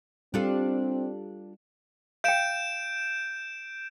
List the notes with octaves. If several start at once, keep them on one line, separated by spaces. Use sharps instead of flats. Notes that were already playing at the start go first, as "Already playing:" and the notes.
G3 C4 D4 F4 G4 A4
F5 G5 G6 D7 E7